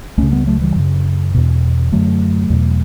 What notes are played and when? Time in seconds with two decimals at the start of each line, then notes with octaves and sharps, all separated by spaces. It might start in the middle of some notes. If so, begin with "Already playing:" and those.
0.18 C#2 C#3 A3 C#4
0.32 G3 B3
0.47 F#3 A3
0.61 E3 G3
0.76 F#2 C#3
1.34 E2 B2
1.92 F#2 D3 F#3 A3
2.50 E2 B2